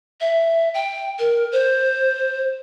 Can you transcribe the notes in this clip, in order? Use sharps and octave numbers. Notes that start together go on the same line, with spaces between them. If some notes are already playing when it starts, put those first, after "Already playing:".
E5
G5
A#4
C5